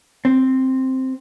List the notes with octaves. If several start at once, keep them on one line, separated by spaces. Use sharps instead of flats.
C4